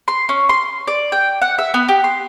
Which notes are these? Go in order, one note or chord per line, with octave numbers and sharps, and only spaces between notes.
C6
C#4
C6
D5
G5
F#5
E5
B3
G4
C6